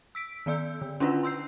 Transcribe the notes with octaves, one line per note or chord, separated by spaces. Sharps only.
E6 B6 D7
D#3 B3 D5 E6 G6
D3
C#4 D4 E4 F4 B4 F#5
C6 E6 G6 C7